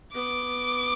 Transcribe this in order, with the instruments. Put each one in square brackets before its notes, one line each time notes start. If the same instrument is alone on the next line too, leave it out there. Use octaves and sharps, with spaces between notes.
[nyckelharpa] B3 [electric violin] D6